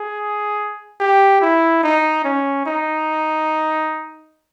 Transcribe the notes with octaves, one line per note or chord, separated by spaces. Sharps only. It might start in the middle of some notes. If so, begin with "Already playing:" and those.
Already playing: G#4
G4
E4
D#4
C#4
D#4